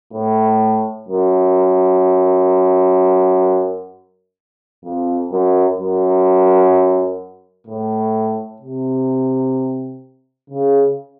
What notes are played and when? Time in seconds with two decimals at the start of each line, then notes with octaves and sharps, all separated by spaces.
0.13 A2
1.08 F#2
4.84 F2
5.32 F#2
5.79 F#2
7.67 A2
8.62 C3
10.50 C#3